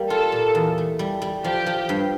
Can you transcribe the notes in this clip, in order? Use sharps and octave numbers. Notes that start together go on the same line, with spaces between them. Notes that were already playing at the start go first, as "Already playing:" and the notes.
Already playing: G3 A#3
F4 A4
A#2
E2
A3
G3
G3
F3 G4
F3
G2